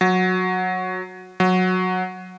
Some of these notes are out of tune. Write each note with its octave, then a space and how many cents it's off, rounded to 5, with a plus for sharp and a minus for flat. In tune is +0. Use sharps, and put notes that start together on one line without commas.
F#3 -15
F#3 -15